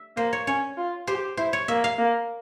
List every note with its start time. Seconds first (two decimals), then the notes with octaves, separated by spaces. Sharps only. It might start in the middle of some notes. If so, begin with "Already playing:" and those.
Already playing: E5
0.16 A#3 C5
0.33 C#5
0.47 C#4 C#5
0.77 F4
1.07 G4 C5
1.37 E4 C5
1.53 C#5
1.68 A#3 E5
1.84 F5
1.98 A#3